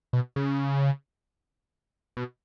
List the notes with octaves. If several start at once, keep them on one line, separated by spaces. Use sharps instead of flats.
B2
C#3
B2